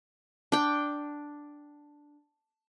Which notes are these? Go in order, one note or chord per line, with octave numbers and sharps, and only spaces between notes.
D4 G5